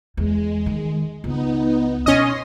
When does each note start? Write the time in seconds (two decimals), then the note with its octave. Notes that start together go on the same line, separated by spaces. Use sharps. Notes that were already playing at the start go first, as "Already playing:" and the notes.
0.17 E2 G#3
0.66 D#3
1.24 C#2 B3 D#4
2.06 B2 C#4 D#5 C6